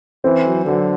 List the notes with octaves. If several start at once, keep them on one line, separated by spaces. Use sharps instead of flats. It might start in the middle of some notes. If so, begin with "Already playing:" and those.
E3 C4
F#3
D3 F#3